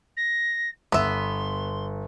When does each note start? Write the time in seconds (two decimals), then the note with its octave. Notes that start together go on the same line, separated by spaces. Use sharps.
0.17 A#6
0.92 G1 B3 E5 C6